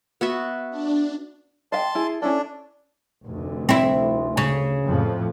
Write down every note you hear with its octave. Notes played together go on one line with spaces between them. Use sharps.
B3 F#4 E5
D4
D#5 F5 G5 A5 C6
E4 G#4
C#4 D4 E4 A4
F1 D2
C4 E4
C#3
F2 A2 F3